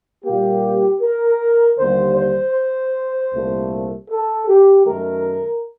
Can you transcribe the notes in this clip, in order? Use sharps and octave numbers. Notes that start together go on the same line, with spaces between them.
A#2 G3 A#3 G4
A#4
D#2 D3 G3 A#3 C5
C5
C2 A#2 A3
A4
G4
F#2 D#3 A3 A#4